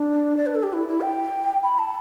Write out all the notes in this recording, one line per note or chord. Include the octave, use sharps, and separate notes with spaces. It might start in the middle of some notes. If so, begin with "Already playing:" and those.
Already playing: D4
D5
B4
A4
G4
E4
E4
G5
B5
A5